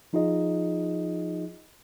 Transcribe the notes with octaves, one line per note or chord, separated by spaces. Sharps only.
F3 D#4 F4 G#4 D#5